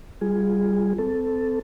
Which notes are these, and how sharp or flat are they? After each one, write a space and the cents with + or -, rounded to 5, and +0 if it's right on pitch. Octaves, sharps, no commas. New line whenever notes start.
G3 +0 F4 +0 G#4 +0
C4 -20 A4 +0